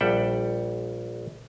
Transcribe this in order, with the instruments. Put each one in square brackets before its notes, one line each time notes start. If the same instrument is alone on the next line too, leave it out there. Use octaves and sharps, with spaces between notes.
[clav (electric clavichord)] A#1 G3 E5 F#5 G5